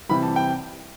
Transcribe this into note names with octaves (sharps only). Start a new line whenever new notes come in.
C3 E3 G3 B5
A5
G5